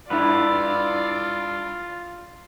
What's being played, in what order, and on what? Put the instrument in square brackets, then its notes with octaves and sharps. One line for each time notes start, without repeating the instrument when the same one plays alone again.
[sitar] G2 D4 E4 [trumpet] F4 [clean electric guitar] B4 [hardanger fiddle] D5